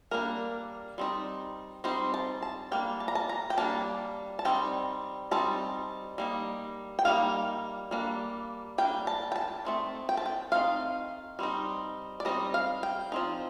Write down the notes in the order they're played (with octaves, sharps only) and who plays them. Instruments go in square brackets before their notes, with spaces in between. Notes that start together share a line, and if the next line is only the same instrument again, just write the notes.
[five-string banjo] G3 A#3 D4 A#4
G3 C4 D#4
G3 C4 D#4 C5
A5
A5
G3 A#3 D4 G5
A5
A#5
A5
A#5
G5
G3 A#3 D4 A5
A5
G3 C4 D#4 G5
G3 C4 D#4 A5
G3 A#3 D#4
G5
G3 A#3 D#4 F5
G3 A#3 D4
G3 A#3 D4 G5
A5
G5
A5
A3 C4 D#4
G5
A5
G5
A3 C4 D#4 F5
G3 C4 D#4
D5
G3 C4 D#4 D#5
F5
G5
F3 C4 D#4